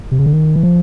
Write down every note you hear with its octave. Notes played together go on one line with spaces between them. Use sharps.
C3
C#3
D3
D#3
E3
F3